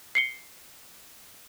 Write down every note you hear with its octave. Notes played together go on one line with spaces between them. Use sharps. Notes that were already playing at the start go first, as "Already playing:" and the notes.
C7 C#7 G7